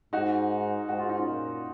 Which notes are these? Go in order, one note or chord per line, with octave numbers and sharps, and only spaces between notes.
G#2 D#4 F#4
G#2 F#4
F4
D#4
C#4 F4
A#2